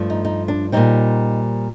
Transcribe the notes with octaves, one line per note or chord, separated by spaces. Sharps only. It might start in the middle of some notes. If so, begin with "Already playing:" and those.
Already playing: G2 F3 A3
D#4
D#4
D4
A#2 G3 C4 D#4